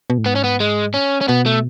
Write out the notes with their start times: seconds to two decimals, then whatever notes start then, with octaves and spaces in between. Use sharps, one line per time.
0.10 B2
0.18 A2
0.25 G#2 B3
0.36 C#4
0.44 B3
0.60 G#3
0.94 C#4
1.21 C#4
1.28 B2 B3
1.46 A3